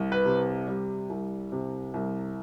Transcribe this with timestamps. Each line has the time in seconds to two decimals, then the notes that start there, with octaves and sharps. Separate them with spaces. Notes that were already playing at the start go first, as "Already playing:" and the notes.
Already playing: C2
0.12 B4
0.25 C3
0.68 G3
1.10 C2
1.52 C3
1.94 C2